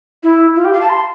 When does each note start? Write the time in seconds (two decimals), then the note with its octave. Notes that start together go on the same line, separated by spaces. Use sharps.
0.23 E4
0.56 F4
0.64 G4
0.73 F5
0.81 A5
0.89 C6